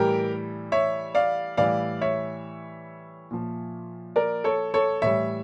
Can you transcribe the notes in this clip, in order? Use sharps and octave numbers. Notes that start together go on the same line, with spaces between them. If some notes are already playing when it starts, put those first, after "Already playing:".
Already playing: A2 E3 G3 G4 A#4
C#5 E5
D5 F5
A2 E3 G3 D5 F5
C#5 E5
A#2 F3
A#4 D5
A4 C#5
A4 C#5
A2 E3 G3 C#5 E5